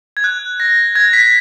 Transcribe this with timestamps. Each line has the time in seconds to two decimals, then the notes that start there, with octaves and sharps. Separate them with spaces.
0.17 G#6
0.24 F#6
0.60 A#6
0.95 G#6
1.13 B6